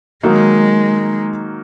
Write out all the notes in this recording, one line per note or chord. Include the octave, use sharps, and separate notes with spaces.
D#3 F#3 G#3 A#3 D#4